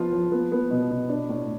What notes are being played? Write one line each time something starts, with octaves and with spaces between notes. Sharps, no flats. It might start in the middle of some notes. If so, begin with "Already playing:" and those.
Already playing: F3 B3 F4
F3
B3
B3
B2
B2
D4
A2